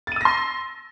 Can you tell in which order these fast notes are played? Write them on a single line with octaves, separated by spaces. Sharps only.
A6 D#7 E6 A#6 C6